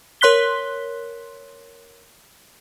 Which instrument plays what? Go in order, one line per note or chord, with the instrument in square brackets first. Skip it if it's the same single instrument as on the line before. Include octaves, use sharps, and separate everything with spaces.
[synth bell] A#4 C#5 C6 F#6 B6 G7